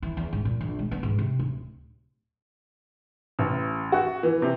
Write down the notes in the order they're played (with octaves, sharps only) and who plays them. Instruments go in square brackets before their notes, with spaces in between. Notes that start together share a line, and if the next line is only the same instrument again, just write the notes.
[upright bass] E3
E2
G#2
A#2
A#1
G#3
B3
G#2
C3
D1
[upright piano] A1
F#4
E3
C3